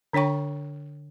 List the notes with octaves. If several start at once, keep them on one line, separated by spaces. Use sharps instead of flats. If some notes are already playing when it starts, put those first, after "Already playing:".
D3 D4 C#5 G5 C#6